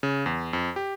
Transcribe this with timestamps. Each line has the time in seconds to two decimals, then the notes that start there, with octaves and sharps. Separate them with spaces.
0.03 C#3
0.26 E2
0.53 F2
0.76 G4